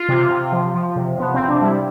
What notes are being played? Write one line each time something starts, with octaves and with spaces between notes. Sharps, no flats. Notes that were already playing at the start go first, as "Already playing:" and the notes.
Already playing: F4
C3
C3
F3
F3
C3
F3 B3
C4
C3
D4
G3 E4